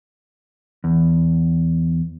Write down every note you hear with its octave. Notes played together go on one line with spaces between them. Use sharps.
E2